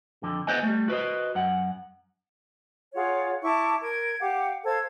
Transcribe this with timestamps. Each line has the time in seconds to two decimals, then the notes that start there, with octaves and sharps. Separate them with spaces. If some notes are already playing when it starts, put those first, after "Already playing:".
0.23 F2 D3
0.47 B3 B4 C5 D#5 G#5
0.63 G3 A3
0.88 F#4 B4 C5 D#5
1.35 F#2 F#5
2.93 F4 G#4 C#5 F#5
3.43 E4 A5 C#6 D6
3.81 A#4 G#6
4.20 G4 F5 F#5 D6
4.64 A4 C5 F5 G#6